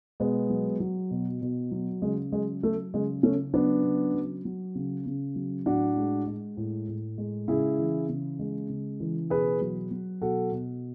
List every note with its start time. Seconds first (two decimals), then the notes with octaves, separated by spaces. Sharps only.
0.20 B2 G#3 B3
0.50 F#3
0.80 F#3
1.11 B2
1.42 B2
1.72 F#3
2.02 C#3 G#3
2.32 F#3 G#3
2.63 F#3 A3
2.94 C#3 G#3
3.23 C#3 A3 C#4
3.53 F#3 B3 D4
3.84 C#3
4.14 F#3
4.45 F#3
4.75 C#3
5.06 C#3
5.36 F#3
5.66 A2 D4 F#4
5.97 G#3
6.27 G#3
6.57 A2
6.88 A2
7.18 G#3
7.48 C#3 E4 G#4
7.79 E3
8.09 C#3
8.39 G#3
8.69 C#3
9.00 E3
9.30 B2 G#4 B4
9.61 F#3
9.91 F#3
10.22 B2 F#4 A4
10.52 B2